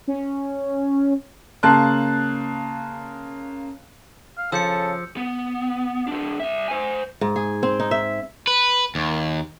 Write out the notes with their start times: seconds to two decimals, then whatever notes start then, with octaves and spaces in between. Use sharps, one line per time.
0.08 C#4
1.63 C#3 A#3 A5 C6 F#6
4.38 F5
4.52 C#3 F3 A4 E6 G6 C#7
5.17 B3
6.08 E3 D4
6.40 C2 E5
6.68 C5 G#5
7.21 G#2
7.36 G#4
7.63 C4
7.80 D#4
7.91 E5
8.47 B4
8.95 D#2